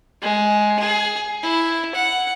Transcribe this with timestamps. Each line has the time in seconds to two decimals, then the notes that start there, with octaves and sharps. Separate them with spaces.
0.22 G#3
0.80 G#4
1.43 E4
1.95 F#5